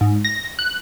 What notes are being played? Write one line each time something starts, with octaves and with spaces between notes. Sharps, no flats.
G#2
A#6
F#6